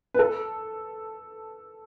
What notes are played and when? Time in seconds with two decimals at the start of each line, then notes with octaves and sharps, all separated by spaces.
0.14 B4
0.19 A4